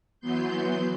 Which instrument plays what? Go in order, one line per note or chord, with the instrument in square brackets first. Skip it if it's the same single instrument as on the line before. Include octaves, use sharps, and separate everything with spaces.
[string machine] E3 F#3 B3 C6 G6